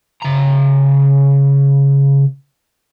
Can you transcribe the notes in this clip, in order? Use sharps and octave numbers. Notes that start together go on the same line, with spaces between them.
C#3 A#5